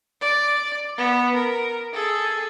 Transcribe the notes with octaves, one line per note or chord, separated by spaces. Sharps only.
D5
B3
A#4
G#4 A4